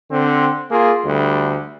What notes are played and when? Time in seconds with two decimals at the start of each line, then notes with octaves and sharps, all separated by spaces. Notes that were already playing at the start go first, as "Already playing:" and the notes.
0.10 D3 C4
0.71 A#3 F4 G#4
1.06 D2 D3 G3